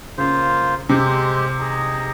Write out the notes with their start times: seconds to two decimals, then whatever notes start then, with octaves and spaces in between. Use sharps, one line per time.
0.18 C#3 A#3 F4 C5
0.89 C3 G#3 C4 G4
1.59 D#4 G#4 D#5